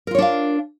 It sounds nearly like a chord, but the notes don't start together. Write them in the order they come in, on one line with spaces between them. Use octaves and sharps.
A#4 F4 C#5 D4 F5